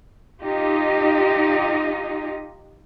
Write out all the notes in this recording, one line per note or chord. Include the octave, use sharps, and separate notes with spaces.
D#4 F4 G4 D#5